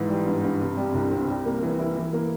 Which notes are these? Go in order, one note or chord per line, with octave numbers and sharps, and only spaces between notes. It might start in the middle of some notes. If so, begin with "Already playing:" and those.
Already playing: G#2 E3
G3
G2
G2
C3
G3
C2
C4
G3
A#3
E3
E4
E3
A#3